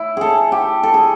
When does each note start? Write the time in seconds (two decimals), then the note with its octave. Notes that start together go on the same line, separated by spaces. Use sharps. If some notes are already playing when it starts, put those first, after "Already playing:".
Already playing: E4
0.17 G#4 A4
0.52 G4
0.83 A4
0.94 G#4